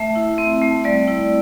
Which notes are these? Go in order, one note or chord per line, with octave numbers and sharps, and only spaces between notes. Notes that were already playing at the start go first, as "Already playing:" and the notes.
Already playing: A3 E5
E4
C4
A3
G3 D5
E4